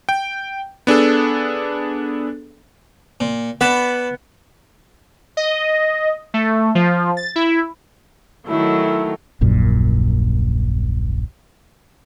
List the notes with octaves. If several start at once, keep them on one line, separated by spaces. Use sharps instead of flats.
G5
B3 D4 G#4 A4
A#2
B3 B4 D5 A5
D#5
A3
F3
A6
E4
D#3 F#3 A3 E4
D#1 A#1 F#2 A#2